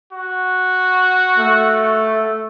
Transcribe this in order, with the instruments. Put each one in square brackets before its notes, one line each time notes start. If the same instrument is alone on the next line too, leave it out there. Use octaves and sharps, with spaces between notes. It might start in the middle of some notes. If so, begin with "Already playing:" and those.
[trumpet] F#4
[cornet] A3